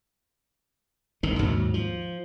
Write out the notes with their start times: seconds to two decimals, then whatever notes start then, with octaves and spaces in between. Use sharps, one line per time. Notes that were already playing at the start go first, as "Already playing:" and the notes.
1.23 G1 D#3
1.39 D#2 G#2 F#3
1.74 F3